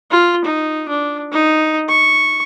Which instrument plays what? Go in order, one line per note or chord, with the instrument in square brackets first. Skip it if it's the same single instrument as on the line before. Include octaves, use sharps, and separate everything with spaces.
[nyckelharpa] F4
D#4
D4
D#4
C#6